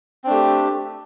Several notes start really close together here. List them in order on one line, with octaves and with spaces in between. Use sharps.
C4 D4 A3 G4